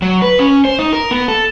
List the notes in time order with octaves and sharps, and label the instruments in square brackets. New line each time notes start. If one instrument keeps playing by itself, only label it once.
[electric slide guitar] F#3
B4
C#4
C5
D#4
A#4
B3
A4